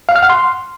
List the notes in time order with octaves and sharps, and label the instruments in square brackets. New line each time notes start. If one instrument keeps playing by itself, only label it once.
[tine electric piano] F5
F6
F#5
C6